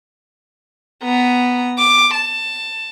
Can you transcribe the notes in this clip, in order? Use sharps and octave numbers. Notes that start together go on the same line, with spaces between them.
B3 A#5
D6
A5